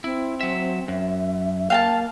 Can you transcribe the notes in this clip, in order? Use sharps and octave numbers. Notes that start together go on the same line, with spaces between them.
C4 E4
F#3 E5
F#2 E5
A#3 F5 G5 A5